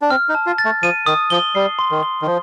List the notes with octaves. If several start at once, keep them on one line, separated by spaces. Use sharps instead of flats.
D4
C4 F6
D#4
A5
F4
A6
A3
F3 D#7
D#3 D#6
F3 G7
G3 C7
C6
D#3
G7
D#3
F3